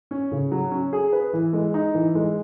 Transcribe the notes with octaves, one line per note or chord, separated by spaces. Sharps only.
C#4
C#3
F#3
C#4
G#4
B4
E3
G#3
D#4
E3
G#3